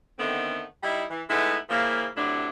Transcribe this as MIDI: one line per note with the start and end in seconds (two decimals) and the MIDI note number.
0.19 0.63 50
0.19 0.63 51
0.19 0.63 57
0.19 0.63 59
0.19 0.63 60
0.83 1.04 55
0.83 1.04 63
0.83 1.04 64
1.10 1.22 52
1.30 1.56 56
1.30 1.56 57
1.30 1.56 59
1.30 1.56 63
1.30 1.56 64
1.70 2.06 46
1.70 2.06 49
1.70 2.06 53
1.70 2.06 58
1.70 2.06 64
2.17 2.49 45
2.17 2.49 48
2.17 2.49 54
2.17 2.49 62
2.17 2.49 64